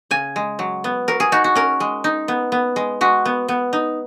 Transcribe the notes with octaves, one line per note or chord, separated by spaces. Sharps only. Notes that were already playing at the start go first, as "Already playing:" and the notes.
C#3 G#5
G#3
F#3
B3
F#3 A#4
G#4
D#4 F#4
F#4
C#4 A#4
G#3
D#4
B3
B3
G#3
G#3 F#4
B3
B3
D#4